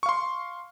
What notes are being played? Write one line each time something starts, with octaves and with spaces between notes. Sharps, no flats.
F5 C6 C#6